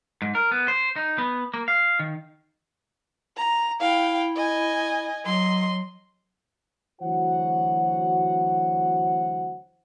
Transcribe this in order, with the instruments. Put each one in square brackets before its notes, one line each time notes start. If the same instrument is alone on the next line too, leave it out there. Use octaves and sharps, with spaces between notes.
[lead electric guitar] G#2
A#4
B3
C5
D#4
B3
A#3
F5
D#3
[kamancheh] A#5
[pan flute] E4 [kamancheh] F5 G5
[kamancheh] D#5 G#5
[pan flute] F#3 [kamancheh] D#5 C6
[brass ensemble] D2 E3 F#3 F#4 C5 F#5